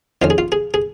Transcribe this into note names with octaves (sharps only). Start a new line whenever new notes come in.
F2 D#3 C#4 F4
G#4
F4
G#4
G#4